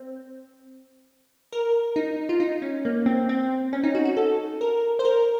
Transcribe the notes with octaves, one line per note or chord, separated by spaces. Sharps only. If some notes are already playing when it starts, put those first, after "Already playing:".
Already playing: C4
A#4
D#4
F4
D#4
C#4
A#3
C4
C4
C#4
D#4
F#4
F#4
A4
A#4
C5
A#4